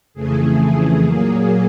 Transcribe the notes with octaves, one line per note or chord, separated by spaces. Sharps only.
F2 C#3 E3 A3 G#4
A#2 F#3 A#3